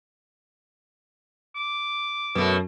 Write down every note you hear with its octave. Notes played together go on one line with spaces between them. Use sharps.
D6
F#2 B2 A3